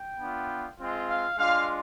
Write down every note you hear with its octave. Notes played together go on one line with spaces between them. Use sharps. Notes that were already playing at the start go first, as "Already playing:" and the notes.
Already playing: G5
B3 D4 F4
G#3 C4 F4
F5
G#3 D4 F4 F5